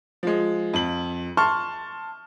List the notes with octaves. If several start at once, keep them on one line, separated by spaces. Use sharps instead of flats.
F3 G#3
F2 F#7
A5 C6 C#6 F6